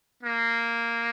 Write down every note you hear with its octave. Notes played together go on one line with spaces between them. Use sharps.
A#3